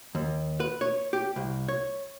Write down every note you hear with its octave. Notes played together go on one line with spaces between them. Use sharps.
D#2
B4
C#5
G4
C2
C#5